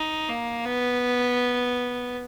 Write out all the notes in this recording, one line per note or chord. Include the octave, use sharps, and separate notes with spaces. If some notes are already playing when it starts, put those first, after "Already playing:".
Already playing: D#4
A#3
B3